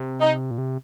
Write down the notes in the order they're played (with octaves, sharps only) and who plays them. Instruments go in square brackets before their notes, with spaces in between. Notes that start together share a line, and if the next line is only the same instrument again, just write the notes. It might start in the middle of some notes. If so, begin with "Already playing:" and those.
Already playing: [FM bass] C3
[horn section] D#4
[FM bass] A#2
C3